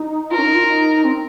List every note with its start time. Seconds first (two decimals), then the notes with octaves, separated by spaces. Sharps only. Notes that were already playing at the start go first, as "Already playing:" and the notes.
Already playing: D#4
0.31 F4 A#4
0.37 C#4
0.43 D#4
0.55 F4
0.67 D#4
1.04 C4